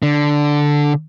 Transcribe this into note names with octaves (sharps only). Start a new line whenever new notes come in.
D3